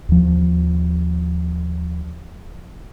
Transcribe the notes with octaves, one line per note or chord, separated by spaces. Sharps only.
D#2 F3